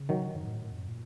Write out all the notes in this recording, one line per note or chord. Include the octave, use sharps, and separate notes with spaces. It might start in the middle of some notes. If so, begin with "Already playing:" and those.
Already playing: C#3
D#3 F#3
F#2
A2
A2
F2
F#2
A#2